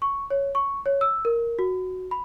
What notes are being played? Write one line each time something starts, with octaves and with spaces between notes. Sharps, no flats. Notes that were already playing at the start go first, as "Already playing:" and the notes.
C#6
C#5
C#6
C#5
E6
A#4
F#4
B5